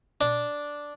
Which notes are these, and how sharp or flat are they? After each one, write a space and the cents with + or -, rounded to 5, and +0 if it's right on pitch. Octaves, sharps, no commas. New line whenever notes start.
D4 -5